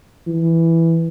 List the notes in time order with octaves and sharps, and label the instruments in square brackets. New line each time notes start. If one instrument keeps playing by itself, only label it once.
[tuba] E3